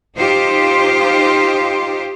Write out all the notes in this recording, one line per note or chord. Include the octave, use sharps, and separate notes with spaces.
D#4 F4 G4 C5